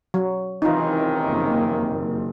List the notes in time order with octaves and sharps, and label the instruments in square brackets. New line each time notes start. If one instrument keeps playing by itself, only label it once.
[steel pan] F#3
[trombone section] C#2 C3 D#3 [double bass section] E3 C4 [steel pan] D#4 F4
[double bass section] F#1 F2 A#3
F#1